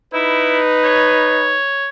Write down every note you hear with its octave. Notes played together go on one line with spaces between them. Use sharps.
D#4 E4 B4
C#5